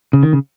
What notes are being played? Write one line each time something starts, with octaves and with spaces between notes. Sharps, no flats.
C#3
D#3
C#3